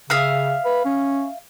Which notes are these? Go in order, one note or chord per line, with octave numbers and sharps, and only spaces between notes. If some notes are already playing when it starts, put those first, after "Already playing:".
C#3 E5 F5 D#6
B4
C#4